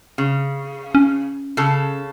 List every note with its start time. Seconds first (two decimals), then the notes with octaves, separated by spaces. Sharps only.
0.18 C#3
0.95 C#4
1.57 C#3 A4